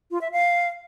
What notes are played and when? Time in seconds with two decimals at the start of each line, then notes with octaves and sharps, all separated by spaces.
0.11 F4
0.21 E5
0.32 F5